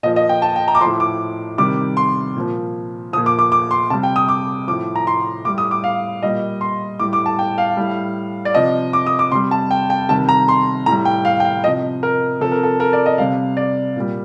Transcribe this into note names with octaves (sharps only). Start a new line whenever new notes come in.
A#2 F3 D#5
D#5
G5
A5
G5
A#5
D6
A2 F3 C6
D6
C3 D#3 G3 D6
C6
A#2 F3
A#2 F3 D#6
D6
D6
D6
C6
C3 G3 A5
G5
D#6
D6
A2 F3 D6
A#5
C6
A2 G3 D6
D#6
D6
F5
A#2 G3 D#5
C6
A2 G3 D6
D6
A5
G5
F5
A2 G3
D5
C3 F3 D#5
D6
D#6
D6
C3 G3 C6
A5
G5
G5
C3 D#3 G3 A5
A#5
C6
A2 G3 A#5
G5
F5
G5
F5
C3 F3 D#5
A#4
C3 F3 A4
A#4
A4
A#4
D5
D#5
C3 G3 F5
D5
A#2 G3